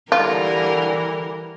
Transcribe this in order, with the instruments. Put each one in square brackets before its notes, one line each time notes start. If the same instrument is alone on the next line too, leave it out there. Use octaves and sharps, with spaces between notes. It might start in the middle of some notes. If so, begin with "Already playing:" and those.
[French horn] D3 [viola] E3 G3 [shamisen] F4 [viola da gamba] A#4